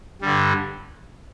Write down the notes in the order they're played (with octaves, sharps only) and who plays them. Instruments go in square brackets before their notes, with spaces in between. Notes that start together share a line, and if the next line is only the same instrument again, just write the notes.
[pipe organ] G2 D3 G3